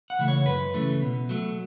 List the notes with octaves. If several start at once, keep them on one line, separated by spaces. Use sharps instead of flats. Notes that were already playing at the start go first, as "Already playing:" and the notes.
F#5
C#3 E3 A3
C#5
F#2 B4
C#3 E3 A3
B2
F#3 A3